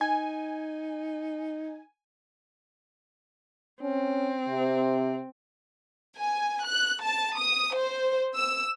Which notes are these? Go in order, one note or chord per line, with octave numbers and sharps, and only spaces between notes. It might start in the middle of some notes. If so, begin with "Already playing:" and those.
D#4 G#5
C4 C#4
C3
G#5
F#6
A5
D#6
C5
E6